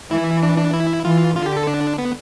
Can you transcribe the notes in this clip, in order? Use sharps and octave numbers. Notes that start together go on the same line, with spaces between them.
E3 E4
D4
D4
E4
E3 F4
D3 F4
G4
A4
D4
B3